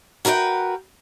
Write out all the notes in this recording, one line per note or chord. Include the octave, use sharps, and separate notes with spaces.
F#4 A#4 B4 D#5 G5